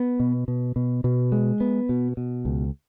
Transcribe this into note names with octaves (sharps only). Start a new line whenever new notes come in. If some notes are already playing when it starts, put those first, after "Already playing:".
Already playing: B3
B2
B2
B2
B2
G#3
B3
B2
B2
C#2